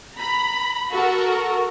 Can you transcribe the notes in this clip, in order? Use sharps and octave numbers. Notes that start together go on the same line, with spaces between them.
A#5 B5
F#4 A4 A#4